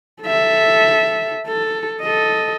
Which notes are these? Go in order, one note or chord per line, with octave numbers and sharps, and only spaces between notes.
A4 E5
A4
A4 D#5